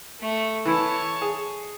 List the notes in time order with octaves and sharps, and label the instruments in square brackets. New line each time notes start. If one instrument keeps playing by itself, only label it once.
[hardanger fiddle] A3
[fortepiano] E3 E4 [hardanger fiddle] C#5 A5
[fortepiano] G#4